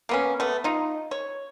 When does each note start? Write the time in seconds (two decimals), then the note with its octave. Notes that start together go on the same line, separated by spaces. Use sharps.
0.09 A#3 B3 C#4
0.40 A3 B3
0.64 D#4 F4
1.11 C#5